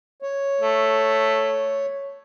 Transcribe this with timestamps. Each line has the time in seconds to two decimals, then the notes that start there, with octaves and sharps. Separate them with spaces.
0.22 C#5
0.61 A3